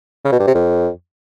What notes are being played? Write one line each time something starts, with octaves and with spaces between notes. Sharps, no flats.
C#3
B2
G2
C3
F2